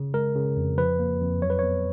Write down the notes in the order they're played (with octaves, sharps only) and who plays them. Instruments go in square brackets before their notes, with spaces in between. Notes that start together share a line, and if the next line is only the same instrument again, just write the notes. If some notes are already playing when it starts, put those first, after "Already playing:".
Already playing: [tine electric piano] C#3
G#3 A#4
C#3
F2
F3 B4
A#3
F2
F#3 C#5
B4
B3 C#5